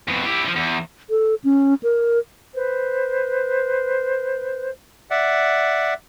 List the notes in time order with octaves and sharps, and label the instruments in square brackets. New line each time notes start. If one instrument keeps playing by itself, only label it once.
[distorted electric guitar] F2 B2
E4 G4
D3 F3
E2
[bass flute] A4
C#4
A#4
[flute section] B4 C5
[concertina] D5 E5 F#5